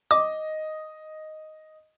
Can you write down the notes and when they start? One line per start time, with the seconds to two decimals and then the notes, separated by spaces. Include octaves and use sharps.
0.11 D#5 D6